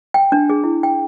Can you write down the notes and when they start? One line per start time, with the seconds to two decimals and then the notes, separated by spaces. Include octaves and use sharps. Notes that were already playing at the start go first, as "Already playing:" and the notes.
0.14 G5
0.32 D4
0.50 G#4
0.64 E4
0.83 G5